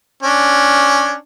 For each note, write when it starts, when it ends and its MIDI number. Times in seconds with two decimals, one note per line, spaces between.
0.23 1.13 61
0.23 1.13 62